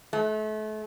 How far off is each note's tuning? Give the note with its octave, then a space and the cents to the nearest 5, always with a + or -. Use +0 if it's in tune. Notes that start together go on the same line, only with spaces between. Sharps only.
A3 -35